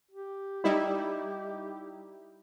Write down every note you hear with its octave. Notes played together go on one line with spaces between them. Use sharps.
G4
G3 D#4 E4